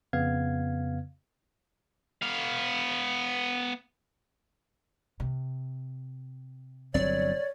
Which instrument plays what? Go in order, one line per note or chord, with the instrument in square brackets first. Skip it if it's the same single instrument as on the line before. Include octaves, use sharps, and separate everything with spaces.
[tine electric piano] F2 C#3 B3 F5 G#6
[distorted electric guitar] B3 F5
[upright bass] C3
[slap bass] G1 F#3 C4 [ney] C#5 [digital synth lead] D5